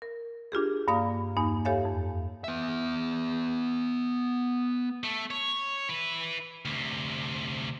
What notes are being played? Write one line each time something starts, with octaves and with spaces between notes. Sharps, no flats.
A#4
D4 F4 G4 G#4
G2 A#3 D5 F5 A#5 D#6
E2 G2 A#3 D#4
G4 A4 C#5 E5 F5 G#5
F2
B3 E5
A3
C#5
E4 B4
D2 C3